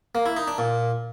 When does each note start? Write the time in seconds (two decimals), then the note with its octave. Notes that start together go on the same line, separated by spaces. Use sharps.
0.15 A#3
0.26 E4
0.37 D#4
0.47 D4
0.58 A#2